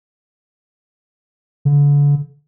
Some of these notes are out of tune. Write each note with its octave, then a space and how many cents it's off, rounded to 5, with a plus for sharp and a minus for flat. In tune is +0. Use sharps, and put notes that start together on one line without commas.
D3 -35